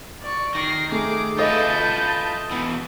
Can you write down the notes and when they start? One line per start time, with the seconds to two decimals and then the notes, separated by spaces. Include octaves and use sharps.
0.22 D5 C#6
0.55 D#3 A#6 C7
0.92 A3 G#4 D6
1.39 F4 A4 B4 D#5 E5 A5 G6
2.51 B2 E3